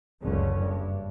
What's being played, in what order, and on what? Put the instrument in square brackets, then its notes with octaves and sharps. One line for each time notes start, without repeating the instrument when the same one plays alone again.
[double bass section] F#1 C#2 D3 C#4
G2